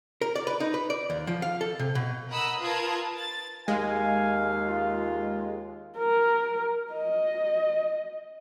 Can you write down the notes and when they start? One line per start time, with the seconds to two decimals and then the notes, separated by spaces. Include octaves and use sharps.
0.21 A#4
0.35 D5
0.47 B4
0.60 D#4
0.74 B4
0.90 D5
1.10 D#2
1.27 F3
1.42 F5
1.61 A4
1.79 C3
1.95 B2
2.30 A#4 D#5 F#5 B5 D#6 E6
2.62 F4 A#4 B4 A5 D#6 G#6
3.17 A6
3.68 D#2 G#3 F5 G#5
4.68 F4
5.98 A#4
6.93 D#5